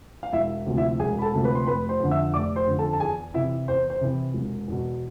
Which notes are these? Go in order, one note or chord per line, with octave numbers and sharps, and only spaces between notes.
F5
E1 E4 E5
D2 C3 F3
E4 E5
E1 G#4 G#5
B5
A4 A5
D2 C3 F3
B4 B5
C6
F1 B4 B5
C5 C6
F2 D3
E5 E6
F1 D5 D6
C5 C6
F2 D3
A4 A5
A5
E2 G#4 G#5
C3 E3 E4 E5
E2 C5
C5
C3 E3
E1
E2 B2